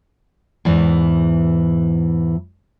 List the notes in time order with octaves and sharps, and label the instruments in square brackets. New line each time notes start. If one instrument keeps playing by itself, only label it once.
[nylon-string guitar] E2 G#2 E3